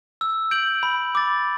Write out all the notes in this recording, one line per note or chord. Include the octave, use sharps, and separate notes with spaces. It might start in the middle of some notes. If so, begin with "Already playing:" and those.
E6
G6 D7 F#7
B5
D6 A6